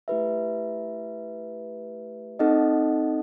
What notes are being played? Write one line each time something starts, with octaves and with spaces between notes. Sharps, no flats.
A3 E4 G4 B4 E5
C4 D#4 A4 D#5 F#5